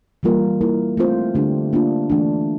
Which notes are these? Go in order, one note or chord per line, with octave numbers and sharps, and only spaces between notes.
E3 G3 A#3 F4 A#4
A#3 E4 A#4
A3 C4 F4 C5
D3 A3 D4 G4
A#3 D4 F4
E3 A3 D4